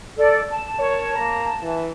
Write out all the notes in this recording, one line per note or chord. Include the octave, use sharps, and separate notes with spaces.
A4 D5
A5
A#4 C#5
A#3 A#5
E3